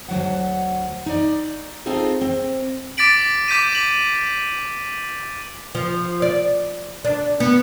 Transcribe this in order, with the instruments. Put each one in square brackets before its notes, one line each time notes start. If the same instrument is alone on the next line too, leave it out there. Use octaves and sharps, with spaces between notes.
[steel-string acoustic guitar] D2 F#3 F#5
D#4 D5
C4 D#4 F4 G#4 A4
C4
[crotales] D6 A6 B6 D7 F#7
D6 G6 B6 D#7
F#7
[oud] F3
D5
D4
B3